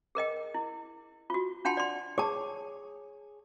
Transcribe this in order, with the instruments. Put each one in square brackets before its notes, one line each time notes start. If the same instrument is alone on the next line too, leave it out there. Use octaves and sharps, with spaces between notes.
[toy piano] G#4 A#4 D#5 G5
E4
F4 F#4
D4 F4 F#5 G5 A5 C6
D5 C6
[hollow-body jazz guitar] G#4 C#5 [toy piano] A5 D6